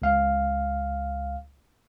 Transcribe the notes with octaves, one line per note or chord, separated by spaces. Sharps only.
C#2 F5